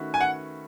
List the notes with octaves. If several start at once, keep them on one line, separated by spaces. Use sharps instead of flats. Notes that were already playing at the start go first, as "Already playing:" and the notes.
Already playing: D#3 A3 C#4 F#4 B4
G#5
F#5